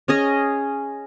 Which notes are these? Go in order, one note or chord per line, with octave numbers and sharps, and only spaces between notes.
C#4 G#4 D#5